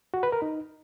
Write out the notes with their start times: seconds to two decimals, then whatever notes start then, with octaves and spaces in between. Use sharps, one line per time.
0.14 F#4
0.23 B4
0.32 A#4
0.42 D#4